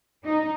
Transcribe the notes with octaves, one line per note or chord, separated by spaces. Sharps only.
D#4